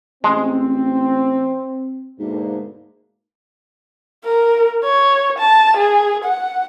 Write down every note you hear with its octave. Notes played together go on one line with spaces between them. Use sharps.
A1 G#3 C4
D2 G#2 B2 A#3
A#4
C#5
A5
G#4
F#5